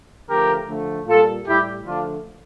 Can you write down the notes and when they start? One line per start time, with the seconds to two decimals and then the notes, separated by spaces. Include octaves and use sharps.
0.28 D3 F3 A3 G4 A#4
0.67 D3 F3 A3
1.07 A#2 G3 F4 A4
1.46 A2 G3 E4 G4
1.86 D3 F3 A3 D4 F4